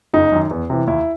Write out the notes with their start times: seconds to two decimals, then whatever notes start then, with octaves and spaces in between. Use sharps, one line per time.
0.13 F#1 D#4
0.32 F#2 D#3
0.51 E2
0.70 C3 E3
0.87 D#2 E4